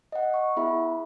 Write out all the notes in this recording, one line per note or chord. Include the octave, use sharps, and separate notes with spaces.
D#5 F#5
C#6
B3 E4 G#4 E5 B5